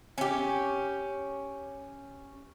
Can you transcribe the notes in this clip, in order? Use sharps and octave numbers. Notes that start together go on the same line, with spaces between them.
C#4 G4